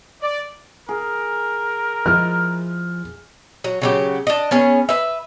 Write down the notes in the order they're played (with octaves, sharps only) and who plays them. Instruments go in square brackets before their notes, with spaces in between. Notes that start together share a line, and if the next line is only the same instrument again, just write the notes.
[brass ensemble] D5
[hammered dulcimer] G#4 [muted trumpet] A#4
[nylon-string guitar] F3 G#3 E4 [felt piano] F6
[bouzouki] F#3
C#3 F#3 G4
D4 D#5
B3 C#4 G#4
B4 E5